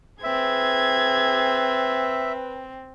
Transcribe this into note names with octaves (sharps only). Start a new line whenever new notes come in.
C4 G#4 B4 E5 G#6